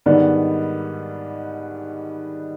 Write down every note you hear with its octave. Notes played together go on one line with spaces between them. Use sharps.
G#2 D#3 G3 B3 D4